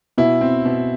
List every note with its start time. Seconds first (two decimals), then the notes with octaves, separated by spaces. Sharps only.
0.18 B2 E4
0.41 C4
0.65 B2